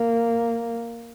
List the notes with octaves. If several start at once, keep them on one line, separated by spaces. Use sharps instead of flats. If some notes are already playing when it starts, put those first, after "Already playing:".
Already playing: A#3